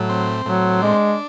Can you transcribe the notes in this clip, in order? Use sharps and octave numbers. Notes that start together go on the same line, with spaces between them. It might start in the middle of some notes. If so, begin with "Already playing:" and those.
Already playing: A2 F#3
C4
A2 F#3
G#3 D4